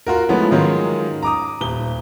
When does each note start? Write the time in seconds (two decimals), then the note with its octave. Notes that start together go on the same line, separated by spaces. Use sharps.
0.07 F4 F#4 A#4
0.29 F3 G#3 A3 B3 C#4 E4
0.51 G#2 D#3 F#3 G#3 C#4 F4
1.23 A#5 D6 D#6
1.61 D#1 G7